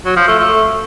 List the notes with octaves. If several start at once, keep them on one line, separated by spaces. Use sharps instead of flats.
F#3
F3
A3
A3